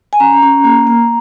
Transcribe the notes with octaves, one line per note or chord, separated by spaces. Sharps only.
G#5
C#4 A#5
C#4
A#3
A#3